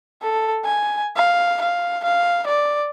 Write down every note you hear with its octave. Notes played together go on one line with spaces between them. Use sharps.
A4
G#5
F5
F5
F5
D5